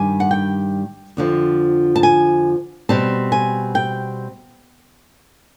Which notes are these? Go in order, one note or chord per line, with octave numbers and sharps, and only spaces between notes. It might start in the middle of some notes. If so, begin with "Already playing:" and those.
Already playing: G2 D#3 G3 G#5
F#5
G5
F2 D3 F3
A5
G#5
B2 G3 C4 A5
G#5
G5